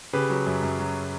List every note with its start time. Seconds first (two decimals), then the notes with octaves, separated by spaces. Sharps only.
0.13 C#3 G4 B4
0.30 F#3
0.46 F#2
0.63 F#2
0.79 F#3